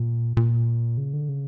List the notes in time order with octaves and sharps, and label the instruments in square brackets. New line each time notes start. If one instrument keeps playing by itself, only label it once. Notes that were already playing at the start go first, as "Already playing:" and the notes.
Already playing: [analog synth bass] A#2
A#2
C#3
D3
C#3